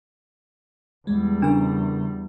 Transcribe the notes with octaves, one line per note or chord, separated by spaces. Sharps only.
E2 G3 G#3
C#3 D4 A#4